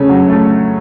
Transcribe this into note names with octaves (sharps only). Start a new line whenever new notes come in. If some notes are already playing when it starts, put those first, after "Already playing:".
Already playing: C#3 A3 C#4
F#3
A3